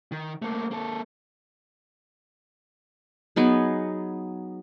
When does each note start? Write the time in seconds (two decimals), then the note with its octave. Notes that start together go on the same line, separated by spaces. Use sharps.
0.12 D#3
0.42 A3 A#3
0.71 A#3 A4
3.36 F#3 B3 D#4 G#4